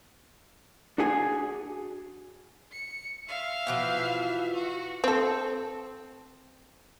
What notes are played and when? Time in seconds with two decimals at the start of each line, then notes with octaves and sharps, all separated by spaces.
0.98 D4 F#4 G#4 G#5
2.71 C#7
3.27 E5 F5
3.67 B2 E3 F3
4.54 F#4
5.04 C4 A4